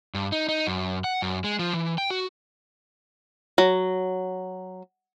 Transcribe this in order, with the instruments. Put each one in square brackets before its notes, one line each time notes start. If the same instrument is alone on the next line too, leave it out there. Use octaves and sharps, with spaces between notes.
[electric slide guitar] G2
D#4
D#4
F#2
F#5
F#2
G#3
F3
E3
G5
F#4
[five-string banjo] F#3